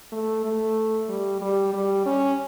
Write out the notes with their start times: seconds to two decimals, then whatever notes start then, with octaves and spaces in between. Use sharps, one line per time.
0.12 A3
0.45 A3
1.09 G3
1.41 G3
1.73 G3
2.06 C#4